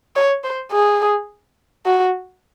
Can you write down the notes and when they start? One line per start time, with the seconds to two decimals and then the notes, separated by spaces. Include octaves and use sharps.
0.16 C#5
0.44 C5
0.72 G#4
1.86 F#4